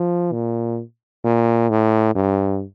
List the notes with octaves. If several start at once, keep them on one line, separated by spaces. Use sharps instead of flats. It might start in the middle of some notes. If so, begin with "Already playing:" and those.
Already playing: F3
A#2
A#2
A2
G2